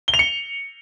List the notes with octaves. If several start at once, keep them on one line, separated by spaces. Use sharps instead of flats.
G7
F7
C#7